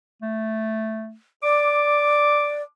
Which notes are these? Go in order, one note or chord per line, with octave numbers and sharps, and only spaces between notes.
A3
D5 D6